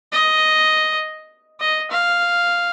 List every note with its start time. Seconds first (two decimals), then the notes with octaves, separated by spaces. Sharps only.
0.12 D#5
1.60 D#5
1.90 F5